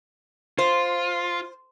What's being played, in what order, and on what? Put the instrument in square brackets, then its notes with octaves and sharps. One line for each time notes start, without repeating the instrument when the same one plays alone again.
[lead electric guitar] F4 [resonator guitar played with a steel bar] C5